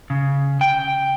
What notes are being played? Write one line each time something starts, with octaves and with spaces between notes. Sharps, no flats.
C#3
G5